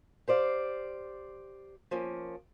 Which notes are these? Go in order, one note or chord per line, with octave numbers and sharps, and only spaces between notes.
G4 C5 D5 F5
F3 A#3 C#4